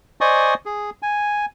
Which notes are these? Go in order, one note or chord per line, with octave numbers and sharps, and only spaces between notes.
C5 D5 D#5 G#5 C#6 D#6
G#4
G#5